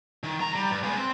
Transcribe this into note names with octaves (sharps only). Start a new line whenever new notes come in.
D#3
B1 A#5
G3
G2
G#3 B3
C4